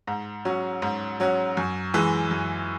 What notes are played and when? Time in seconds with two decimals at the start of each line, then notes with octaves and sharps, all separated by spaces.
0.07 G#2
0.45 F#3 C#4 F#4
0.82 G#2
1.20 F#3 C#4 F#4
1.57 F#2
1.94 E3 G#3
2.31 F#2